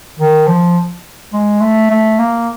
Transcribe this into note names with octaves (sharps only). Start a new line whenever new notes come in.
D#3
F3
G#3
A3
A3
A#3